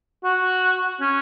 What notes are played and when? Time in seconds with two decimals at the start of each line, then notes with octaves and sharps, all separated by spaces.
0.24 F#4
1.00 C#4